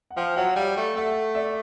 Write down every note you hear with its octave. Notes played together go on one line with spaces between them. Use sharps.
F#5
F3 F5 G5
F#3 E5 F#5
G3 F5 G5
A3
A3 E5 F#5
D5 E5